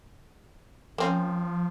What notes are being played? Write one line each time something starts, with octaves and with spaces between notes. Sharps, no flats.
F3 A#3 C4 C#4